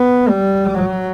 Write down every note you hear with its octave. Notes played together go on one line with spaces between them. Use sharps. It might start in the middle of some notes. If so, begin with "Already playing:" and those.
Already playing: B3
G3
F#3